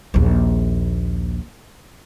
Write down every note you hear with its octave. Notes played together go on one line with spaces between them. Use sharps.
A#1 D#2